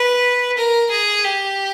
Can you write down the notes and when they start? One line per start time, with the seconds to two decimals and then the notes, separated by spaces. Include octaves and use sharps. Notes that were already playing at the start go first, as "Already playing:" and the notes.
Already playing: B4
0.57 A#4
0.91 G#4
1.24 G4